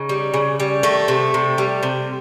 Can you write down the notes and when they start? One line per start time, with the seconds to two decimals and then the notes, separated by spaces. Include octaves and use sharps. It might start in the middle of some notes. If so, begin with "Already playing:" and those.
Already playing: C#3 D#4
0.09 G3
0.34 C#3
0.60 G3
0.83 D#3 A3
1.08 C3
1.34 C3
1.58 G3
1.83 C3